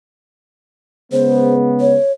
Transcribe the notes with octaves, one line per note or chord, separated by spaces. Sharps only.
C#3 G#3 B3 C5
C#5